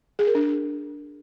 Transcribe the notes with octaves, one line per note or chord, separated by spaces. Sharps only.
G#4
A#4
D4